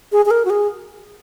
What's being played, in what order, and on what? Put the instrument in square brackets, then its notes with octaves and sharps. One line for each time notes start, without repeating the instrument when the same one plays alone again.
[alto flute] G#4
G#4
A#4
F#4
G#4